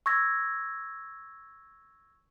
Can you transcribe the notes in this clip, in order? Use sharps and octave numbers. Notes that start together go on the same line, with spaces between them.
C#6 E6 G#6 A#6